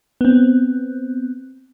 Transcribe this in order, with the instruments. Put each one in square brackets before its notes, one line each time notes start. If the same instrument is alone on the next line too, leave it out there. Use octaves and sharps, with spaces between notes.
[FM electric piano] B3 C4